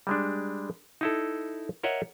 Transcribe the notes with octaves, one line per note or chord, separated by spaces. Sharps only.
G3 G#3 D4
D#4 E4 A4
A#4 C#5 D#5 E5 F#5